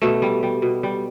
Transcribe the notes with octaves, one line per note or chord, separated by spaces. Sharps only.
B2 A3
G3
G3
B2
G3